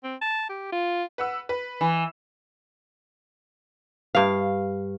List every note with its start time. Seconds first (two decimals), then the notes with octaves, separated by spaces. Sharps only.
0.04 C4
0.22 A5
0.49 G4
0.72 F4
1.18 B4 F#5 E6
1.49 B4
1.81 E3
4.15 G2 F5